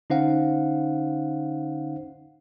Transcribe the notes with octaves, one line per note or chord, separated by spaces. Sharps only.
D3 C#4 D#4 C5 F5 F#5